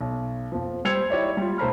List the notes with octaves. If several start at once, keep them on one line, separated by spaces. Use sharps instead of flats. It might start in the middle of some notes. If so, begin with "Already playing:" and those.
B1
F2 F3
G3 C5 E6 G#6 C#7 F7
D#4 E4 G4 C#5 D5 E5
G3 F4
B1 A3 C5 A#5 B5 F6